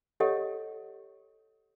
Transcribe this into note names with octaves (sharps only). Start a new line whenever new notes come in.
G4 A4 C#5 D#5 F#5